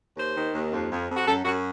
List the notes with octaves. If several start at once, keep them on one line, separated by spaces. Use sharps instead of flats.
D#2 C5
D#3
D#2
F2
F2
F2
F#4
F#2 A4
F#2 F#4